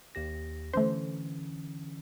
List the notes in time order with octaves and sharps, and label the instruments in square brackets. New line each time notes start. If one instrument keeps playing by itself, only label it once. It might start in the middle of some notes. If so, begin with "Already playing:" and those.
[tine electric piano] D#2 G4 A#6
[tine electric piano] D3 E3 C#4 [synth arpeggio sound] A3 C5